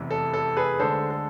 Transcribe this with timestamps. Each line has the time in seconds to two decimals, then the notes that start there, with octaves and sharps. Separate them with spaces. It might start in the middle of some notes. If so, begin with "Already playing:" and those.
Already playing: F1 E2 C3 E3
0.11 A4
0.34 A4
0.57 G#4 B4
0.79 D2 D3 G#3 D4 A4 C5
1.10 A4